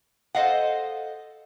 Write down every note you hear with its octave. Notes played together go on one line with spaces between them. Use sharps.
A4 C5 D#5 F5 F#5